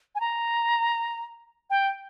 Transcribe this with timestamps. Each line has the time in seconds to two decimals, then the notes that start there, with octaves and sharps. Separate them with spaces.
0.15 G#5
0.21 A#5
1.70 G5